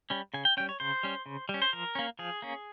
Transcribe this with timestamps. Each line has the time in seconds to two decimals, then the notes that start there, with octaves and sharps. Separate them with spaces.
0.10 G3 C#4
0.34 C#3 G#5
0.45 G5
0.57 G3 C#4 G5
0.69 C#5
0.80 C#3 C5
1.03 G3 C#4
1.26 C#3
1.49 G3
1.54 C#4
1.62 C5
1.73 F3 A#4
1.95 A#3 C#4
2.19 F3 G#4
2.42 A#3 C#4